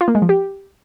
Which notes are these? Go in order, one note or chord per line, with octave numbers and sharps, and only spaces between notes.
F4
A#3
G#3
F3
G4